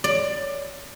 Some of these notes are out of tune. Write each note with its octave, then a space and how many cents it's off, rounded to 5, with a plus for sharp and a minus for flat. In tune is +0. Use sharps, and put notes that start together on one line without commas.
D5 +15